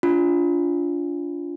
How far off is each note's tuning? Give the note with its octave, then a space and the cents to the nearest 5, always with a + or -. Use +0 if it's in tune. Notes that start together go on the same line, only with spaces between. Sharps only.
D4 -30 F4 +0